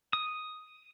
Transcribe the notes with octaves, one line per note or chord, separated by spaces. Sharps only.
D#6